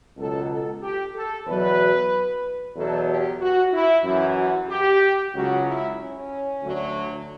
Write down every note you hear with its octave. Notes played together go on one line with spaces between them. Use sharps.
C#2 B2 F#3 A4
A4
G4
A4
E2 B2 F#3 B4
E2 B2 F#3 A4
G4
F#4
E4
F#2 E3 E4
F#4
G4
C#2 C#3 F#3 F#4
E4
C#4
D2 D3 F#3